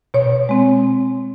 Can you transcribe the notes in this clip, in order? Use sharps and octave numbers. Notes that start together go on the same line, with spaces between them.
B2 C#5
G#3 C4